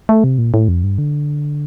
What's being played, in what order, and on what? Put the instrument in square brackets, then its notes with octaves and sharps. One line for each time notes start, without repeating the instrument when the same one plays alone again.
[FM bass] A3
C3
A#2
A2
F2
G2
D3